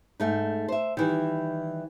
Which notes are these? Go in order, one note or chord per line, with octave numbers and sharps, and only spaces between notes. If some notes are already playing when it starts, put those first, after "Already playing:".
G#2 A3 D#4
C5 E5
D#3 E3 G3